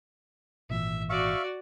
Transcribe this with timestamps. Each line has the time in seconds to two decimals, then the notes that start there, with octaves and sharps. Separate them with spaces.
0.70 G#1 A#2 E3 E5
1.10 F#4 D5 E5 F5 C#6